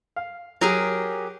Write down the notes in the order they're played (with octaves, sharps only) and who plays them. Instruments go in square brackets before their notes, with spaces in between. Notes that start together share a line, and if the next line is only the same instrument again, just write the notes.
[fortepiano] F5
[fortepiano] F#3 [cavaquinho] G4 G#4 A#4